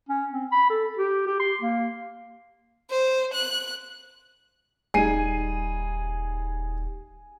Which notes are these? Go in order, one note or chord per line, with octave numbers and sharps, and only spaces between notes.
C#4
C4
B5
A4
G4
G4
C6
A#3
C5
F#6
D#1 G3 D#4 G#4 G#5 C7 D#7